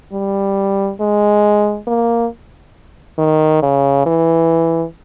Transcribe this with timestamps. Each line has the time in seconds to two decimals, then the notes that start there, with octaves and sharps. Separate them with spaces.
0.13 G3
1.00 G#3
1.87 A#3
3.18 D#3
3.62 C#3
4.06 E3